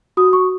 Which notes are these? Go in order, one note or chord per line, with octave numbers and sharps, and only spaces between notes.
F#4 D#6
C#6